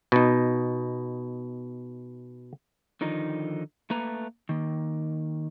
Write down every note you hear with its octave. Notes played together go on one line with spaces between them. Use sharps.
B2 D#4
D3 D#3 F3 D#4
A3 A#3 B4 A#5
D#3 A#3